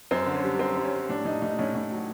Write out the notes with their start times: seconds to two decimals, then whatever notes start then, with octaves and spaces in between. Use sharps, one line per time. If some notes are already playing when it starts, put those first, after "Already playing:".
0.11 F#2 C4
0.26 D3
0.34 C#4
0.44 G3
0.59 G3 C4
0.76 G3
0.84 C#4
0.92 G3
1.09 A2 D4
1.25 A2 D#4
1.42 A2 D#4
1.59 A2 C#4
1.75 A2
1.92 F#3